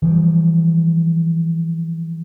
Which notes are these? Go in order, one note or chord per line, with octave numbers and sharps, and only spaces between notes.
E3 F3 G3